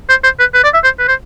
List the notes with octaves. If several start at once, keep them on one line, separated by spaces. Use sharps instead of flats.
C5
C5
B4
B4
D5
E5
C5
B4
C5